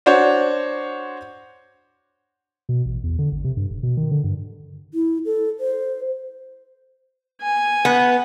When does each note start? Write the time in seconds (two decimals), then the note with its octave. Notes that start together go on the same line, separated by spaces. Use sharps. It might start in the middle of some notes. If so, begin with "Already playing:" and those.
0.06 D4 F#4 C5 C#5
2.69 B2
2.85 A1
3.04 E2
3.19 D3
3.32 G#1
3.44 C3
3.57 G2
3.70 E1
3.83 B2
3.97 D#3
4.11 D3
4.24 G2
4.94 E4
5.25 A4
5.60 C5
7.41 G#5
7.85 B3